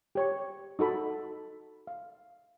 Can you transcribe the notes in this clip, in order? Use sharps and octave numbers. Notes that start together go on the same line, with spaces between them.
G4 C#5 C#6
D#4 F#4 A4 B5
F5